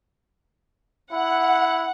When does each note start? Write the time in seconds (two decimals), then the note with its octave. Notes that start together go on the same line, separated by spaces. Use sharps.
1.12 E4 F#5